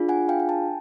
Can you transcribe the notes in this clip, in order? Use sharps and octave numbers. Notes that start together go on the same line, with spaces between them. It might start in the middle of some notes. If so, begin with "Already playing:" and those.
Already playing: D4 F4 G#4
F#5 G#5
F5 G5
G#5
G5 A5